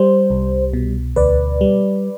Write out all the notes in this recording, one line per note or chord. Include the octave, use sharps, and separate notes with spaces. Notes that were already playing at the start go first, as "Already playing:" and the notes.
Already playing: G3 C5
C2
B2
D2 B4 D5
G3